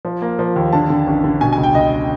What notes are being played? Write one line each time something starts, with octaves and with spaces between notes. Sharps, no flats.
F3
A#3
F3
D#2
D3 A5
D3
A1
D3
B2 G#5
C#2 G#5
G5
C#2 D#5